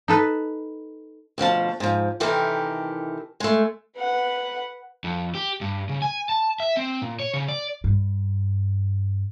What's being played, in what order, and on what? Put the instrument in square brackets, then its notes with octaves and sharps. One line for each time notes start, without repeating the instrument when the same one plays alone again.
[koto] D#4 A4 B4
[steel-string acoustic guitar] D2 B2 F3 A5
G#2 F3
C3 D#3 E3 G4 A4 A#4
G#3 A3
[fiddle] B4 F#5
[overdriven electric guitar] F2
G4
G2
C#3
G#5
A5
E5
C4
A#2
C#5
C#3
D5
[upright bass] G2